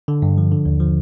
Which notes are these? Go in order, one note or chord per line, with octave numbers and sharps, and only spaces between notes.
D3
G2
F3
D3
D#2
F3